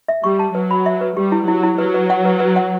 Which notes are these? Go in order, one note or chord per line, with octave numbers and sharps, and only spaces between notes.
E5
G3 C#6
A5
F#3 B4
B5
E5
B4
G3 G4
E4
F#3 E4
E4
F#3 B4
B4
F#5
B4
B4
F#5